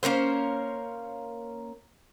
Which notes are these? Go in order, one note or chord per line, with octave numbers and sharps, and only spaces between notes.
A#3 C#4 A#4 C5